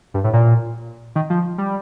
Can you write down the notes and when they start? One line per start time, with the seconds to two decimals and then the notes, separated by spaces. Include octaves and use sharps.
0.14 G2
0.24 A2
0.33 A#2
1.16 D#3
1.30 F3
1.58 G3